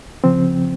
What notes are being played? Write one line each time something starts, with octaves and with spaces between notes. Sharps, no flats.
C#3 F3 C4